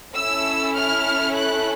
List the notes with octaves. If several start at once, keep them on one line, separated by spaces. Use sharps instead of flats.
C#4 E4 A4 E6
F6
F#6